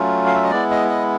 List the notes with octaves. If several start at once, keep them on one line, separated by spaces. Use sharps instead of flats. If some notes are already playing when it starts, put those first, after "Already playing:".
Already playing: F#3 A3 C#4 F4
F5
E5
D#5
G#3 B3 E4 D5
D#5
D#5